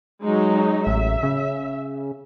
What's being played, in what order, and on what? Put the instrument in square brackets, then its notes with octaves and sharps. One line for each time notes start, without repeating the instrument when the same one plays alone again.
[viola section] F#3 G#3 D#4
[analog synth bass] A1 [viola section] E5
[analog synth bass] C#3